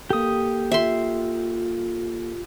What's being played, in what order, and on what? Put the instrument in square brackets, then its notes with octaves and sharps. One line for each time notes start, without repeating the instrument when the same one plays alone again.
[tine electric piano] A#3 A4 [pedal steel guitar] G4 D#6
[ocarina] F4 [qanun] E5 C6